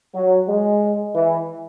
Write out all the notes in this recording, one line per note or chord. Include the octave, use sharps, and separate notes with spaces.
F#3
G#3
E3